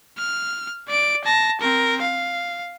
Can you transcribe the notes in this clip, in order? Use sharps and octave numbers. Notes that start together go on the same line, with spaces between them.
F6
D5 D7
A5 A#6
C4 A#4
F5